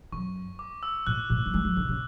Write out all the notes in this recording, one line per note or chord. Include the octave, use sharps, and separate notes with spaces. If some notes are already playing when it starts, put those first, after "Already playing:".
F#2 C#6
D6
E6
A2 F#6
A2
F#3
G#3
F#3
D3
C#3